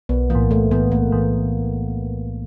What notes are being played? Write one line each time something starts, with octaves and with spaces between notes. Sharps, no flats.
B1 B3
A2 E3 A#3
B1 A3
A2 E3 B3
B1 A#3
A2 E3